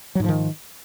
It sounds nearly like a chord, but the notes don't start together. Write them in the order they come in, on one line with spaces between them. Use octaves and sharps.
F#3 G#2 F3 D#3